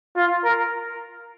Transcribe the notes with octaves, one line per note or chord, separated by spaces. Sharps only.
F4
A#4